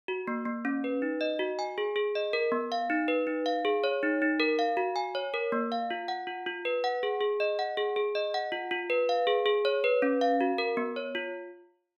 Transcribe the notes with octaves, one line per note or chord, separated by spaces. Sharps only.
F#4
A#3
A#3
C#4
B4
D#4
D#5
F#4
G#5
G#4
G#4
D#5
A#4
B3
F5
D#4
B4
D#4
F5
G#4
C#5
D#4
D#4
A#4
F5
F#4
G#5
C#5
A#4
A#3
F5
F4
F#5
F4
F4
B4
F#5
G#4
G#4
D#5
F#5
G#4
G#4
D#5
F#5
F4
F4
B4
F5
G#4
G#4
C#5
B4
C#4
F5
F#4
A#4
B3
C#5
F4